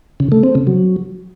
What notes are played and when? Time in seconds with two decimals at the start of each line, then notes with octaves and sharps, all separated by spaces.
0.20 C#3
0.32 A3
0.43 C4
0.55 C#3
0.67 F#3